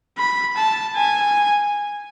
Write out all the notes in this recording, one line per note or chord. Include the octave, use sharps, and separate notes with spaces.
B5
A5
G#5